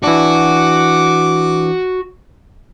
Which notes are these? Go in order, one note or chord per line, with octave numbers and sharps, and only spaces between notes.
E3 D4 F#4 D6